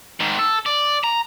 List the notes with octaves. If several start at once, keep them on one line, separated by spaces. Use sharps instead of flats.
G#2 D#3
A4
D5
A#5